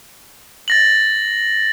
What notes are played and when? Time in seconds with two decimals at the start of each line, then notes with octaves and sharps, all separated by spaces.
0.68 A6 A#6 F#7